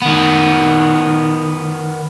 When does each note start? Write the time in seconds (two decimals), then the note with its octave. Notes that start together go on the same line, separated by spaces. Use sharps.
0.02 D#3 B3